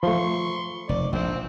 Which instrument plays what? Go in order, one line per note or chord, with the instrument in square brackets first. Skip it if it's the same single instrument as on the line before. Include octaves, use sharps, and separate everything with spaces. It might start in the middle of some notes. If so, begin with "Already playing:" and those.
[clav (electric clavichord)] F3 A3 [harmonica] C6 C#6
[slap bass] F1 [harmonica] D5
[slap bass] A#1 G#2 [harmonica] C4